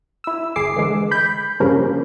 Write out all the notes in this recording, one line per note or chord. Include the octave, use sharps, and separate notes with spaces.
E4 E6
G1 G#4 D6 C7
D3 E3 G#3
B5 G6
G2 C#3 F3 G3 A#3 C#4